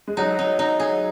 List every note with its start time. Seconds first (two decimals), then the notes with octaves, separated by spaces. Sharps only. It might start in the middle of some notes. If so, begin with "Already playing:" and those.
0.08 G#3
0.17 F#3 D#4
0.39 D#4
0.59 D#4
0.80 G#4